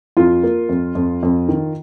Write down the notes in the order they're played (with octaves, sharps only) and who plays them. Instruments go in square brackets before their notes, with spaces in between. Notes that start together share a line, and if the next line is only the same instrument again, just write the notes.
[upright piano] F2 F4
A#3
F2
F2
F2
D#3